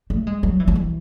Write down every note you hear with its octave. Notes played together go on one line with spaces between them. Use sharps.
A3
G#3
F#3
E3
F#3
E3